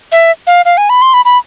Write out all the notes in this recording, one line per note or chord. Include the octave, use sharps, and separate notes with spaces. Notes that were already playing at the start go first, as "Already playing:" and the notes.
E5
F5
F5
G#5
B5
C6
B5
B5